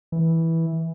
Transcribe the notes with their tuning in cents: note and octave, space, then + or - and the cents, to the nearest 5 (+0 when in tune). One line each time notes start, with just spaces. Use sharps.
E3 -10